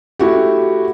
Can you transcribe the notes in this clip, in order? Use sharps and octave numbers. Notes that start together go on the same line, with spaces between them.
A3 E4 F#4 G4